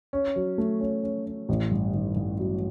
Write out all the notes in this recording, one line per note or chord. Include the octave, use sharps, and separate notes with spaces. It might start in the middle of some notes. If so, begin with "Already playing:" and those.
C#4
F#3
A3
C#4
C#4
C#4
A1
G2
D#3
G2
F#3